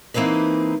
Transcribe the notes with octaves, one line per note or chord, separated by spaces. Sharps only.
E3 A#3 C4 D#4 B4